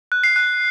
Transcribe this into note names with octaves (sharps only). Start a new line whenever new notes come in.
F#6
C7
F#6